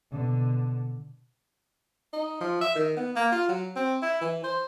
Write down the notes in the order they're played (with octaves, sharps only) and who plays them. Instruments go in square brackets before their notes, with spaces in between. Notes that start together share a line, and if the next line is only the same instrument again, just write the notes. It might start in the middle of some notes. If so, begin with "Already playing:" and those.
[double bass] B2 D3
[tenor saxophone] D#4
F3
E5
D#3
B3
A#3
F4
F#3
C4
E4
E3
C5